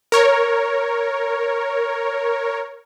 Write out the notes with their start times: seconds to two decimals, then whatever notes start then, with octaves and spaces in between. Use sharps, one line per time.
0.12 A#4 C#5